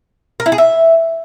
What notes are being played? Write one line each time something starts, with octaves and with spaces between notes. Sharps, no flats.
A#4
E4
G#4
E5